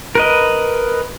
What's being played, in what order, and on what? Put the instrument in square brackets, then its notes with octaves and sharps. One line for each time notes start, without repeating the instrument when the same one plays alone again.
[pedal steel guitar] A#4 B4 D#5